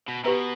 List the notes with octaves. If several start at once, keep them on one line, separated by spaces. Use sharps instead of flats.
B2
B2 G4 B4 F#5 A#5